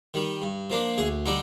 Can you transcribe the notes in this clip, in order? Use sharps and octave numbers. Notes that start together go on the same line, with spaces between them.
D#3 G3
G2
F3 A#3 D4
D2 G#4
D3 G3 D4 D#4